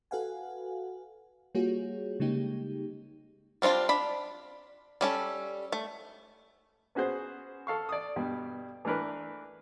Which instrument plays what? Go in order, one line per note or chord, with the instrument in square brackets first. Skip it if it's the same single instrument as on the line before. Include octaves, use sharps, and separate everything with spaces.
[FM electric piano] F#4 A4 B4 F5 F#5 G#5
G3 A#3 F4 F#4 G#4 C#5
C#3 G3 G#3 A#3 D#4 G4
[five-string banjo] G3 C4 D4 F4
D4 B5
G3 C#4 A4
A3
[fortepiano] B3 C#4 F#4 G#4 C5
A4 F5 C#6
D5 D#6
G2 B2 G3
E3 A3 D4 A#4 B4